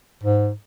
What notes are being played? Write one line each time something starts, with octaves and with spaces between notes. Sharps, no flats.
G#2